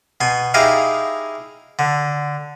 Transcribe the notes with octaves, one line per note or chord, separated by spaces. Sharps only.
B2 G#5 C6
D#4 E4 G4 G#4 D#5 F5
D3